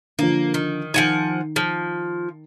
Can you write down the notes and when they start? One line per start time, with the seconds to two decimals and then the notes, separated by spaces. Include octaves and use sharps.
0.19 D3 F3 A#3
0.54 D#3
0.94 D#3 F3 F#5 G#5
1.56 F3